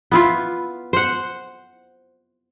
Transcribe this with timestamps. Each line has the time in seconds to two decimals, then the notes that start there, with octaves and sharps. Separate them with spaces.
0.11 B3 E4 F4
0.93 C5 F#5